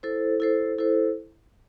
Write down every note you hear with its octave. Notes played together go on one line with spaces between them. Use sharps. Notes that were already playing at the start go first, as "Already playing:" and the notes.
E4 A4 C5
E4 A4 C5
E4 A4 C5